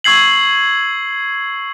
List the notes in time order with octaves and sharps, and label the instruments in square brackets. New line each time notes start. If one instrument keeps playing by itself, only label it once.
[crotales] C#6 E6 G#6 C7 F#7